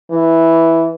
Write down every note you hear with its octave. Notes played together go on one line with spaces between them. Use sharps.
E3